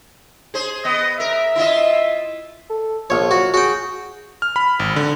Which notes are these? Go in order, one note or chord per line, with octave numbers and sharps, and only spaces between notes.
G#4 C5
B3 D#5
A#4 E5
E4 F4 D#5
A4
A#1 F3 C#5
F#3 F#4
F#4 G#4 G5
F6
B5
G#1
D3